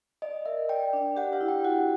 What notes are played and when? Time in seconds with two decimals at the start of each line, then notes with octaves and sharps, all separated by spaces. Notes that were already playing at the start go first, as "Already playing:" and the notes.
0.22 D5 D#5
0.46 A#4 E5
0.69 D5 G5
0.93 D4
1.17 G4 F#5
1.33 F5
1.41 E4
1.48 G5
1.64 F#4 F#5